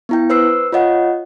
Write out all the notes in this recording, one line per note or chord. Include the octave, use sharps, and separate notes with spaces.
B3 E4 G5
B4 C5 E6 C7
F4 C#5 D#5 F#5